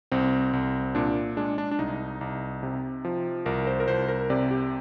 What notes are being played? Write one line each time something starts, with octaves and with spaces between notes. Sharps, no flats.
C2 C4
C2
A#2 D4
G#3 D4
D4
D4
C2 D#4
C2
C3
F3
C2 A#4
C5
A#4
C2 C5
A#4
C3 D5
G4